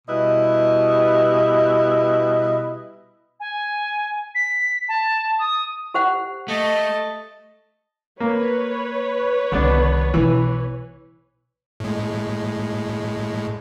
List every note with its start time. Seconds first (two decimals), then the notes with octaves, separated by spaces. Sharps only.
0.08 B2 G3 E4 B4 D#5
3.40 G#5
4.35 B6
4.89 A5
5.39 D#6
5.94 G4 C5 F#5
6.48 A3 D#5 A5
8.20 A#3 B4 C#5
9.52 C2 D3 D#3 B3 D4
10.14 B1 E3 E4
11.80 A2 G#3